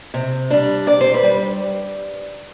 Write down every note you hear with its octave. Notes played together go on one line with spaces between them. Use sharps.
C3
G3 D4
C3 D5
C5
B4
G3